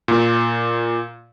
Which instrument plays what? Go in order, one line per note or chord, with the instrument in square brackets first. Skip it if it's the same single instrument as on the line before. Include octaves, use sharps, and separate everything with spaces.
[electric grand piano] A#2